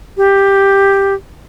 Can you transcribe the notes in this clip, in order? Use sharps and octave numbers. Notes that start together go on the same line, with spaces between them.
G4